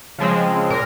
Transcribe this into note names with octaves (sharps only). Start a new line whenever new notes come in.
C#3 F3 G#3 C4
A#2 A#4